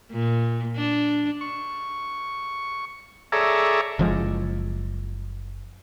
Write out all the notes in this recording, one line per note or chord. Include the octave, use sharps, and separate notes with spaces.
A#2
D4
C#6
G#4 A4 C#5 D5 E5 A#5
F#1 F3 G#3